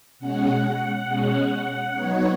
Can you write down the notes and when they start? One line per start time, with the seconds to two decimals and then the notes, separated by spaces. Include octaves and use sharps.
0.19 B2 G#3 C#4 F#5
1.06 B2 G#3 C#4
1.94 F#3 B3 D#4 C#5